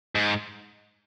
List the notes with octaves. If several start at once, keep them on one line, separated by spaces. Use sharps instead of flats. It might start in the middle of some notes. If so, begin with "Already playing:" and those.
G#2